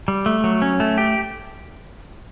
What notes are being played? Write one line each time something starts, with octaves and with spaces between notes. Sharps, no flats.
G3
A3
F#3
C#4
A3
G4